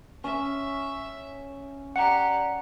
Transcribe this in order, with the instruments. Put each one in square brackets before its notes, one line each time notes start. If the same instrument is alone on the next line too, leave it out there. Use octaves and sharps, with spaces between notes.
[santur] C#4 [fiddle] E5
[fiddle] G4 D5 [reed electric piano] F#5 [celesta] A#5 C#7